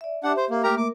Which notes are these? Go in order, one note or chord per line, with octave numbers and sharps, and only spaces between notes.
D5 E5
D4 G4 E5 F#5
C5
A#3
A3 A#3 G4 A#4 E5 A#5
A#4 D6